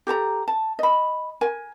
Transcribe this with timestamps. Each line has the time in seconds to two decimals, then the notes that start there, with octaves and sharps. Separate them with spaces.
0.07 G4 A4 A5 A#5
0.48 A5
0.79 D#5 B5
1.41 A#4 G#5